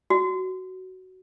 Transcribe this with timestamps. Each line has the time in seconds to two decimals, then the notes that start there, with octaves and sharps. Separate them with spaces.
0.10 F#4